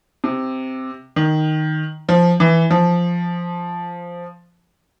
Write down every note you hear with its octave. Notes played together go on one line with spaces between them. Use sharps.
C3
D#3
F3
E3
F3